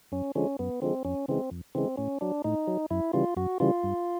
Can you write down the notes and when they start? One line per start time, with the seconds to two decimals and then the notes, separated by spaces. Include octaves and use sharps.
0.12 F#2 C#4
0.35 D3 F3 G#3 C#4
0.59 F#2 B3
0.82 D3 F3 G#3 C4
1.05 F2 C#4
1.28 C#3 E3 G#3 C4
1.51 F2
1.75 C#3 E3 G#3 C4
1.97 A2 C#4
2.21 F#3 D4
2.44 A2 D#4
2.67 F#3
2.90 F#2 E4
3.13 C#3 E3 G3 F4
3.36 F#2 F#4
3.60 C#3 E3 G3 F4
3.83 G2